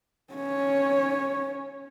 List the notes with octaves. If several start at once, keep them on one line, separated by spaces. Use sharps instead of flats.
C#4 C#5